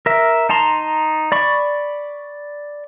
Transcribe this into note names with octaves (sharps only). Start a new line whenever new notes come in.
A#4 E5
D#4 A5 A#5 C6
D5 B5 C#6